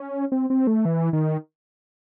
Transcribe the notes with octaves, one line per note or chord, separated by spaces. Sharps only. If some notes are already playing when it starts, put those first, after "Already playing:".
Already playing: C#4
C4
C4
A3
E3
D#3